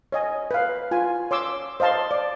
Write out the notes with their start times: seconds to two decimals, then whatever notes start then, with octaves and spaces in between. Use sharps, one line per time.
0.12 C#5 D#5 G#5
0.51 B4 F5
0.91 F4 G#5
1.31 C#5 C6 D6 E6
1.80 C5 D#5 F5 A5 C6
2.11 D5